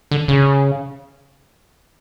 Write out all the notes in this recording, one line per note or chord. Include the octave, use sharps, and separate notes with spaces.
D3
C#3